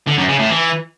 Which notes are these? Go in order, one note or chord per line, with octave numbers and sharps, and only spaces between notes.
D3
F#2
C#3
A2
E3